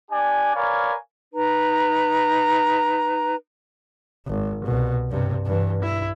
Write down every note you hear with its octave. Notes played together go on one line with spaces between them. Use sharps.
D4 G4 D5 G#5
A#4 B4 C#5 D5 F5 G#5
D#4 B4 A#5
G#1
C2 B2
G2 C3
G2 E3
E4